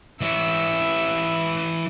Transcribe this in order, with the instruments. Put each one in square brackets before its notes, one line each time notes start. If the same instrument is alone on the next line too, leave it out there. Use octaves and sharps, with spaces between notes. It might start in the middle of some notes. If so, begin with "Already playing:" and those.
[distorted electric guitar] E3 C#5 [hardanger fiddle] E5